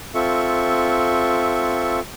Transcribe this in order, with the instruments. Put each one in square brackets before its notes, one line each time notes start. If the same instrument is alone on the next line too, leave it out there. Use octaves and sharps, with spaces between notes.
[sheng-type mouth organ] C4 F4 A4 E5 C#6